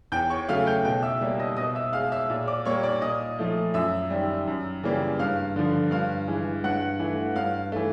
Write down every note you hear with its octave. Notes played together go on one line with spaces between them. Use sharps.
E2 G5 G6
C#5 C#6
C#3 F#3 A3 F5 F6
G5 G6
B2 G5 G6
E5 E6
G3 A#3
D#5 D#6
B2 D#5 D#6
E5 E6
G#3 F5 F6
E5 E6
A#2
D5 D6
G3 A#3 C#5 C#6
D5 D6
A#2 D#5 D#6
F3 A3
F#2 E5 E6
D#3 G3
F#2
C#3 E3 G3 A#3
G2 F5 F6
D3 F3
G2 F5 F6
E3 G#3
G2 F#5 F#6
E3 A3
G2 F5 F6
E3 A3